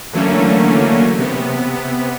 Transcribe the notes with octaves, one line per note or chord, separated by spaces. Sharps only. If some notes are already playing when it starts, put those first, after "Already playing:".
D3 E3 F#3 A3 A#3 C#4
C3 B3